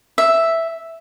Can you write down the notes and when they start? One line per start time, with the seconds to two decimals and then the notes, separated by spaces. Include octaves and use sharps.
0.18 E5